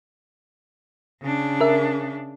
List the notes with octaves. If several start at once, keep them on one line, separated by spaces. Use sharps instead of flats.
C#3 D4
A#4 E5